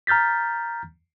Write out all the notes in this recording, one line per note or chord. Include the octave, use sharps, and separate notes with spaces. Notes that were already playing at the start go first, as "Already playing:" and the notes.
A#5 F6 G6 A6 B6